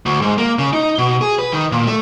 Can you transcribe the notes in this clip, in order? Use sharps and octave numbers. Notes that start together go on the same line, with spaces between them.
D2
G#2
A#3
C#3
D#4
B2
G#4
B4
D#3
A#2
A3